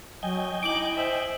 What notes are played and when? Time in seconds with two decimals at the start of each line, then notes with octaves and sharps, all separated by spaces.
0.23 F#3 D#5 G5 G#5
0.63 D#4 E4 D6 D7 F#7
0.95 C5 E5